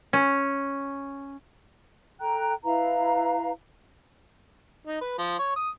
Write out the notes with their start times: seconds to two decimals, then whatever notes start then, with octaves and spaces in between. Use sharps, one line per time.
0.13 C#4
2.21 A4 G5 A#5 F#6
2.64 E4 B4 F5 A#5
4.87 D#4
5.01 B4
5.18 F3
5.39 C#5
5.56 D#6